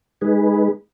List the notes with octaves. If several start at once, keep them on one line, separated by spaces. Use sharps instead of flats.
G#3 D#4 G#4 B4